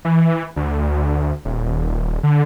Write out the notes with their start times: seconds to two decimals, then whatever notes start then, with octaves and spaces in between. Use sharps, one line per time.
0.05 E3
0.56 D2
1.45 D#1
2.23 D3